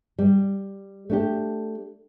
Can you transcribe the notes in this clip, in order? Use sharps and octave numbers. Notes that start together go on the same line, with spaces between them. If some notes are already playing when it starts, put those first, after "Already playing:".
G3
A3 D4 G4